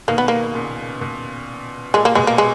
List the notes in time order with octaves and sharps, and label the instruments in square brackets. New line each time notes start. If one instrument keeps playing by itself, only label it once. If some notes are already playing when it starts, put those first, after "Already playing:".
[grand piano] B2 D#3 [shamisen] A#3
[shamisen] B3
A#3
[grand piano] A#2 C#3
B2
[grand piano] A#2 [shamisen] G#3
[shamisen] A#3
[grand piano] B2 [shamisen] G#3
[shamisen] A#3
G#3